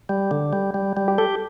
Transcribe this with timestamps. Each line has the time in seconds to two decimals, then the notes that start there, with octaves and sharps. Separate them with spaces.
0.09 G3
0.31 D3
0.53 G3
0.74 G3
0.97 G3
1.08 G4
1.18 G4 A4